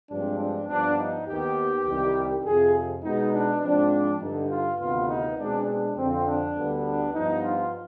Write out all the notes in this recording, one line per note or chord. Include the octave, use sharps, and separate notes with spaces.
G2 F3 G#3 C4 D4
D4
G2 F3 B3 D4
D#4
D#2 D#3 B3 G4
C2 C3 D#3 G3
F2 C3 F3 G#4
B2 G#3 B3 D#4
D4
G#2 F3 C4 D4
G2 D3 G3 D#4
F4
D2 C3 D#3 B3 F4
D#4
B2 G#3 C4 D4
D4
F2 D3 F3 C4
D4
D2 D3 G3 B3
D4
G2 F3 B3 D#4
F4